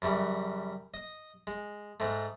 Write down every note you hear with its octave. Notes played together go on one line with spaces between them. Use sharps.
F#2 C#3 E3 G3
D#5 D#6
G#3
G#2 G#3 A3